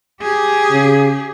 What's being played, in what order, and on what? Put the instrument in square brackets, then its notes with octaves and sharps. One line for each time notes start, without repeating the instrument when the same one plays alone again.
[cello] G4 G#4
[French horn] C#3